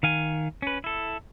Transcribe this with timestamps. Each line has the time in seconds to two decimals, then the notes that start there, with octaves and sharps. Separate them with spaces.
0.03 D#3 F5 G#5
0.62 C#4 B4
0.84 E4 A4